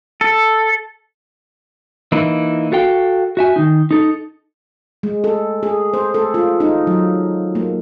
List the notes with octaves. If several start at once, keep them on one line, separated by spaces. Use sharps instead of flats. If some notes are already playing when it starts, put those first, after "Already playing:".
A4
E3 A#3 D#4 E4
F#4 A4 F5 G5
F#4 E5 G#5
D#3 D#4
D#4 A4
G#3
A4
G#4
C5
A4
F4
D#4
F#3
A#3